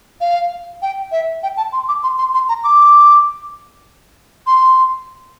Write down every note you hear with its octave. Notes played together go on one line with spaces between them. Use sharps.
F5
G5
E5
G5
A5
C6
D6
C6
C6
C6
A#5
D6
C6